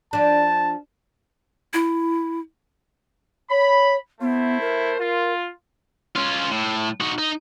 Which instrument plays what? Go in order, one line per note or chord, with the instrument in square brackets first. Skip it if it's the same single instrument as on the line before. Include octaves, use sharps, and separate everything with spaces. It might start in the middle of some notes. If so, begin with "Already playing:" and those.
[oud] F3 D4 [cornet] A5
[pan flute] E4
[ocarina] C#5 [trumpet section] B5
[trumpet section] A3 E4 C5 [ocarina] B3
[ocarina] A#4
[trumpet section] F4
[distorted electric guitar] C#4 F4
A2
D#4 F#4
D#4